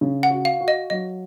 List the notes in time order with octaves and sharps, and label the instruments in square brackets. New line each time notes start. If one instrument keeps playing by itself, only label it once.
[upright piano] C#3
[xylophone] F#5
[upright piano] F#4
[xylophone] F5
[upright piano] F#4
[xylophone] D#5
[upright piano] F#3 [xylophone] D#5